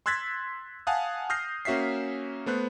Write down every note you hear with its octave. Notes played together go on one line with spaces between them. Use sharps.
C6 E6 F#6 G#6 A6 B6
F5 F#5 G#5 A5 D#6 F#6
D#6 F6 G6 A#6 C7
A#3 C#4 F#4 E5 B6 C7
A3 B3 C5 F#6